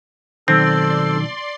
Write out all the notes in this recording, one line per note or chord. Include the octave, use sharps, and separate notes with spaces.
B1 D#3 C4 A4 D5 C6